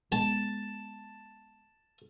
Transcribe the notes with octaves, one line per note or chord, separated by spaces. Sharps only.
G#3 B3 A5